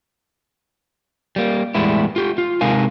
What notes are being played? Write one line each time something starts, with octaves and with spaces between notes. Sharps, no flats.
G3 A#3
E2 A2 G3 G#3 B3 E4
F4 G4
F4
C3 G#3 D#4 A#4 F5 G#5